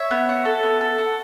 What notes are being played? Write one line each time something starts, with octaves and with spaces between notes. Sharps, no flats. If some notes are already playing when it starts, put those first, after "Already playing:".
Already playing: C#5 E5
B3
F#4
A4
B3
A4
F#4